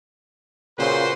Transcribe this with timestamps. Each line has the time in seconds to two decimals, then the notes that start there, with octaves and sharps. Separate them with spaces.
0.79 A#2 C#3 F#4 B4 C5